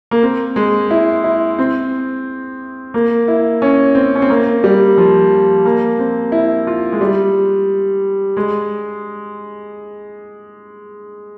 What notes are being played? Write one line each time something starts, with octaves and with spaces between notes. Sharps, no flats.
A#3
C4
G#3
E4
E4
C4
A#3
E4
C#4
C4
C#4
C4
A#3
G3
F3
A#3
C4
E4
F4
G#3
G3
G#3